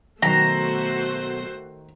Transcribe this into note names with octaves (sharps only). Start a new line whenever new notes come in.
B2 D#3 F#3 A3 F#4 C5 A#5